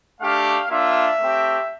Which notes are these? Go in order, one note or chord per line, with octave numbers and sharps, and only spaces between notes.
A3 D4 G4 F5
A#3 D4 F4 E5
A3 C4 G4